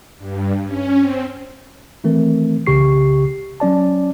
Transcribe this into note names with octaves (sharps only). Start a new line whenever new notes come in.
G2
C#4
C4
D#3 E3 A3 C4 A#4
C2 C#3 G4 C#6 C7
F#3 C#4 D5 A5